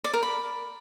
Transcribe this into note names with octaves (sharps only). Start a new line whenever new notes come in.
D5
A#4
B5